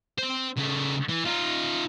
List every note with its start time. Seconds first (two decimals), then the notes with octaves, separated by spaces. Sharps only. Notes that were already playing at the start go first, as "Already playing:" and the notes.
0.18 C4 C5
0.57 C#3 A3
1.08 E3
1.25 D#4 F4